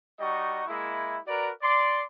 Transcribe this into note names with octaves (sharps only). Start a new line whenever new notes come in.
G3 D#4 F#4 D#5 C#6
G#3 A#3 E4
F#4 A#4 B4 D5 A#5
D5 C6